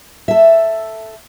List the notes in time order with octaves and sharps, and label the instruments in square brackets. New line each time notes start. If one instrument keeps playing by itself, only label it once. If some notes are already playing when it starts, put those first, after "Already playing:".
[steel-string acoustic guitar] A4 E5